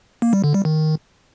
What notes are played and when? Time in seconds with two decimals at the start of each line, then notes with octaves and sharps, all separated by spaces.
0.22 A#3
0.33 G3
0.44 D3
0.54 G3
0.65 D#3